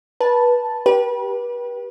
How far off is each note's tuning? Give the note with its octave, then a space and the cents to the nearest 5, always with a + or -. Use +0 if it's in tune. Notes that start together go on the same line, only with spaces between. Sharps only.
B4 -25 A5 +0
G4 -10 B4 -35